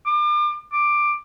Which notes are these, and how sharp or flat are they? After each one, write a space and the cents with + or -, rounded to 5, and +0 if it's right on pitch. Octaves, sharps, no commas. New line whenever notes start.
D6 +35
D6 +10